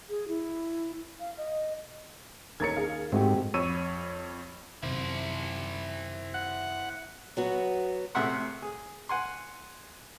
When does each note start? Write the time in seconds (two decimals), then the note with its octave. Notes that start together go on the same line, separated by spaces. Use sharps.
0.09 G#4
0.28 E4
1.20 F5
1.38 D#5
2.60 D#2 A#4 C#5 G#6 A6 C#7
2.76 G#4 F5
3.12 G#2 A3 C4 F#4 G4
3.54 F2 C#5 C#6 E6 D#7
4.83 F#2 C3 D#3 E4 C5
6.34 F#5
7.37 F#3 B3 F#4
8.15 A2 C3 G#4 E5 F#5 C6
8.62 G#4
9.09 F#5 G#5 C6